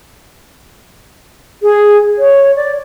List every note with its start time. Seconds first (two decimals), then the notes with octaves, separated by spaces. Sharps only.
1.63 G#4
2.18 C#5
2.56 D5